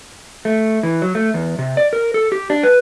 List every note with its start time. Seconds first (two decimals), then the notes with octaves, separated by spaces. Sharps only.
0.45 A3
0.83 E3
1.02 F#3
1.15 A3
1.34 E2
1.59 C3
1.77 D5
1.93 A#4
2.14 A4
2.32 G4
2.50 D4
2.63 B4